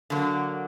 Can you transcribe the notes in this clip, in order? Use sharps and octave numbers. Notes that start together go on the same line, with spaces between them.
D3 F#3 A#3